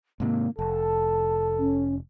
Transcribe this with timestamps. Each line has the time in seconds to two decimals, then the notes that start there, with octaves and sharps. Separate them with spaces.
0.20 G#2 C3 D#3 A#3
0.59 F1 A4 A5
1.59 C#4